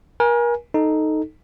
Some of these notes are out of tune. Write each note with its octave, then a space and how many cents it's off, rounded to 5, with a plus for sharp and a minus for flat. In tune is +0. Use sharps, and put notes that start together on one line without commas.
A#4 +35 G#5 +0
D#4 +0 A4 +0